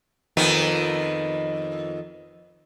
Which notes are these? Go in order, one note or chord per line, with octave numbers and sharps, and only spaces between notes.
F2 D#3 B3